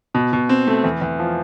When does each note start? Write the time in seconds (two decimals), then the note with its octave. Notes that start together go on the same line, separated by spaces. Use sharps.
0.14 B2
0.33 B2
0.49 C4
0.67 A3
0.84 E2
1.01 E2
1.19 F3